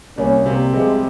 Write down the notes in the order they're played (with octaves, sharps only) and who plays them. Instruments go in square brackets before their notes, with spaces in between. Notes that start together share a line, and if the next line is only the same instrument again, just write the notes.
[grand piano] C2 [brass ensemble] A#3 C#4
[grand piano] C3 [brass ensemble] G3 A#3
[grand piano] C3 [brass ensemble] F3 G#3